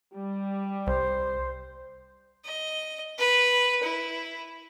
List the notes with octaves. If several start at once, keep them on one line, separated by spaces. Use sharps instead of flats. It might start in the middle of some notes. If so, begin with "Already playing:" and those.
G3
C2 C5
D#5
B4
E4